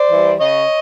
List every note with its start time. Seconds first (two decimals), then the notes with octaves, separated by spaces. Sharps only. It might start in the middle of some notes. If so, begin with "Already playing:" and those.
Already playing: C5 D5
0.11 E3 G3
0.39 C#3 C#5 D#5